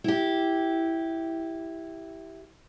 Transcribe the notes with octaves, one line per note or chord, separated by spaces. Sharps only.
E4 G4